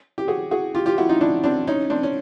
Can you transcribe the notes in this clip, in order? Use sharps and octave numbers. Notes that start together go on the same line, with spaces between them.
G4
F#4 G#4
F#4 G#4
F4 G4
F4 G4
E4 F#4
D#4 F4
D4 E4
C4 D4
C#4 D#4
C4 D4
C#4